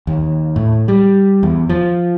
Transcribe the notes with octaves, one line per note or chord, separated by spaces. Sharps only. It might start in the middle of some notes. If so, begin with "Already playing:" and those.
D#2
A2
G3
E2
F3